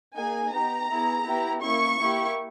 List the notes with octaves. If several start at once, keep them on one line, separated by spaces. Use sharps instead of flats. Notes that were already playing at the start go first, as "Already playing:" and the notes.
A#3 D#4 G#4 G#5
B3 D#4 G4 A#5
B3 E4 G#4
B3 E4 G4
A#3 C#4 E4 C#6
A#3 E4 G4